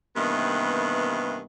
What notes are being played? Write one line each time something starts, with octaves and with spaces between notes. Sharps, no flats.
G2 C3 D#3 E3 A#3 B3